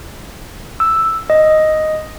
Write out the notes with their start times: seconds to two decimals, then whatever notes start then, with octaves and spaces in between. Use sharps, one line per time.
0.80 E6
1.30 D#5